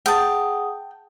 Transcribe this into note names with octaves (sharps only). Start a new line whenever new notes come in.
G#4 F#5 G5 A5 D#6